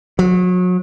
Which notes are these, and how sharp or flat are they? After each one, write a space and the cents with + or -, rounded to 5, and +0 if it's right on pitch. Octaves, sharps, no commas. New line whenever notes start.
F#3 -35